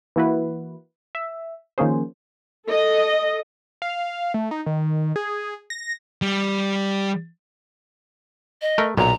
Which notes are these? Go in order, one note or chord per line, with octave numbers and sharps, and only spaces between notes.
E3 A#3 E4 F#4 B4
E5
D#3 F3 A#3 C#4 G#4 C5
A4 D#5
F5
A3
D#4
D#3
G#4
A#6
G3
D#5
A3 A#4
B1 A#2 A#5